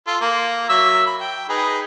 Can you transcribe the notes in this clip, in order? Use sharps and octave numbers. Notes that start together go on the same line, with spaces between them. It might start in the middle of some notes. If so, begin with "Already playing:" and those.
F4 A4
A#3
F#3 E5 E6
B5
G5
D#4 G#4 B4